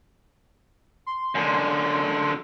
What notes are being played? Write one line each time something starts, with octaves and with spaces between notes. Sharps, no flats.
C6
F#2 D3